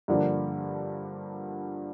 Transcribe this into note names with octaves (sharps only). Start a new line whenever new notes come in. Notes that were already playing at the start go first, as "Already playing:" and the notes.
G2 D3 F3 A#3 D4